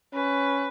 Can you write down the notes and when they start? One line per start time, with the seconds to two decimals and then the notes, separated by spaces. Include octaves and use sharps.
0.14 C#4 B4